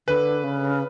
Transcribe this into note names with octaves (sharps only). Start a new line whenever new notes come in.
D3 B4
C#3